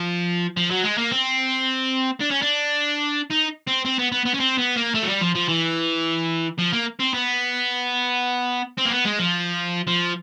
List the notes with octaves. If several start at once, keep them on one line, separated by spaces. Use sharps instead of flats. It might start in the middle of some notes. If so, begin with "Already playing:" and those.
Already playing: F3
F3
F#3
G#3
A#3
C4
D4
C#4
D4
D#4
C4
C4
B3
B3
B3
C#4
C4
B3
A#3
A3
F#3
G3
F3
F3
E3
F3
A#3
C4
B3
C4
A#3
B3
G#3
F3
F3